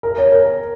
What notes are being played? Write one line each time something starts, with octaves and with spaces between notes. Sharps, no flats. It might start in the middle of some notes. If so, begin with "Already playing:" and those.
A#4
C#5
A#4